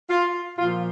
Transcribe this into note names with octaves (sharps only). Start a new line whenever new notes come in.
F4
A#2 F3 F4